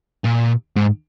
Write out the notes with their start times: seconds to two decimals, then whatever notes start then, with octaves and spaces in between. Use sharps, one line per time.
0.25 A#2
0.76 G#2